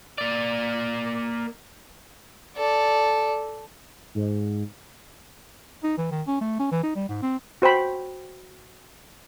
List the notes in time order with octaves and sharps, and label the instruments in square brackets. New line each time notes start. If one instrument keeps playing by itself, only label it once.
[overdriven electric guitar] A#3 D5
[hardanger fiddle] A4 D5
[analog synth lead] G#2
[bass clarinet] D#4
E3
D#3
C#4
A3
C#4
E3
D#4
G3
G#2
C4
[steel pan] F#4 C5 G5 B5